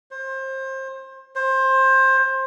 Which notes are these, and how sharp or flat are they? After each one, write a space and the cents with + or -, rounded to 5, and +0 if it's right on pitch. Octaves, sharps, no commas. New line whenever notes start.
C5 +25
C5 +20